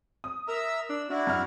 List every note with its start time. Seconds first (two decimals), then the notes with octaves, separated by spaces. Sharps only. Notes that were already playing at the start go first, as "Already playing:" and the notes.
0.24 D#6
0.48 A#4 E5 A#5 E6
0.90 D4 E6
1.10 D4 E4 F#4
1.27 F#2 F6